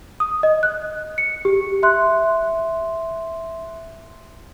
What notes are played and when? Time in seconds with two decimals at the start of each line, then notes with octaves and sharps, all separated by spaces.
0.20 D#6
0.43 D#5
0.63 F#6
1.18 C#7
1.45 G4
1.83 E5 C6 F#6